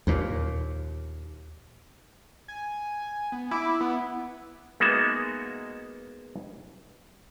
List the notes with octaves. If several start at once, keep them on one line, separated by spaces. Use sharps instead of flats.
D#2 A#2
G#5
B3
E4 D6
B3 E4
G#3 A#3 B3 D#4 F#4 E5